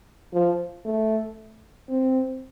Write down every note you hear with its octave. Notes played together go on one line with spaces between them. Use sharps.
F3
A3
C4